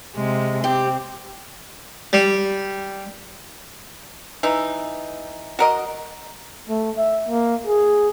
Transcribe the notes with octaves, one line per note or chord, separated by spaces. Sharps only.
C3 G#3
C4 G4
G3
E3 D#4
F#4 A#4 D#5
A3
E5
A#3
G#4